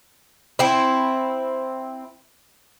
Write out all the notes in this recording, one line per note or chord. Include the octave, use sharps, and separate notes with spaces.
C4 E4